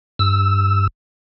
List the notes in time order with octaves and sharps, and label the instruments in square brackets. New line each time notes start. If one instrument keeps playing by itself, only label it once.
[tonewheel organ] G2 E6